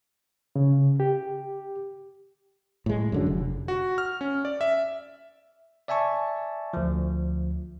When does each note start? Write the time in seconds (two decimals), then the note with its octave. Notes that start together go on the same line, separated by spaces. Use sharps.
0.56 C#3
1.00 G4
2.86 A2 G#3
3.12 F#2 D3 F#3
3.26 F1
3.68 F#4
3.98 F6
4.21 C#4
4.45 D5
4.61 E5
5.88 D5 E5 G#5 A5 C#6
6.73 D2 F3